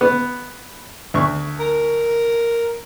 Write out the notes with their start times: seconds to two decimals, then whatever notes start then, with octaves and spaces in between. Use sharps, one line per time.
0.01 B3
1.14 D2 C#6
1.59 A#4